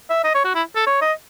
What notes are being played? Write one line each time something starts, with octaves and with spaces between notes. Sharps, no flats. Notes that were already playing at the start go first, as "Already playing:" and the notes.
E5
D#5
C#5
F#4
E4
A4
C#5
D#5